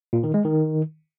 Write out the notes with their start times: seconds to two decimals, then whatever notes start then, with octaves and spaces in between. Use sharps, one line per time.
0.13 A#2
0.24 D#3
0.34 G#3
0.45 D#3